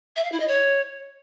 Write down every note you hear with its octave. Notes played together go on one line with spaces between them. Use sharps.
E5
F5
E4
D#5
C#5